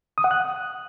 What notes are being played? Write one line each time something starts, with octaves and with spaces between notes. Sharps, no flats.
D#6
F#5
F#6